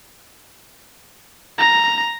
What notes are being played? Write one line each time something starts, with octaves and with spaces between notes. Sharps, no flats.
A#5